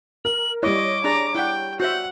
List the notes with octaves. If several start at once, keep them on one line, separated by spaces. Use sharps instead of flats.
A#4 F#7
G3 E4 C#5 D#5 D6
D4 G#4 D5 A#5
E4 F#5 G5
F#4 C5 E5 F#5 G6